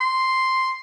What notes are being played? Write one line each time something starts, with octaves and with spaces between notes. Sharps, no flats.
C6